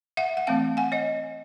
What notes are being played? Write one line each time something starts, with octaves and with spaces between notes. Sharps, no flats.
E5 F#5
F#5
E3 A3 C4 F5 G5
F#5 G#5
C#5 D#5